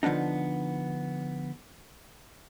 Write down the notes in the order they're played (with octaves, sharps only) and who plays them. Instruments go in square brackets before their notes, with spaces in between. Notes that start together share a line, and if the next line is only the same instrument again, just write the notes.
[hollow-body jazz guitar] D3 F3 B3 D4 D#4